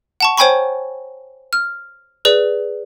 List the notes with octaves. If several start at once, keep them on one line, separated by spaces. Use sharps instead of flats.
F#5 A5 C#6
C5 C#5 G5 G#5 B5 C#6
F6
G#4 B4 D5